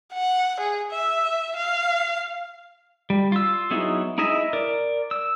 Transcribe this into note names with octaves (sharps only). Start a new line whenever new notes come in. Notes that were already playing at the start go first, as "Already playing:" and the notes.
F#5
G#4
E5
F5
G3
F4 E6
F#3 B3 D#4 E4 G#4
D#4 E4 G#4 D#5 E5
A#4 D5
E6